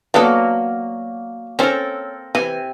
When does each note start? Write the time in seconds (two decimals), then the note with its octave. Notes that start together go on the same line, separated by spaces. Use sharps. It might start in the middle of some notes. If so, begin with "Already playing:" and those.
0.14 F#3 A#3 B3 D4 A4
1.59 C4 C#4 A4 A#4 C5
2.35 C3 E3 G#5